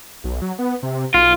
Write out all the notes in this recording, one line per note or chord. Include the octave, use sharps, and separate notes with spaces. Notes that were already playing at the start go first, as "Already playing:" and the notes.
B1
F#3
B3
C3
B1 F4